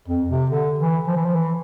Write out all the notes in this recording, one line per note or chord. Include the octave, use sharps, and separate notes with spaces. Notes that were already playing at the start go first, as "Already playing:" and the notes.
F2
C3
D3
E3
F3
E3
F3
E3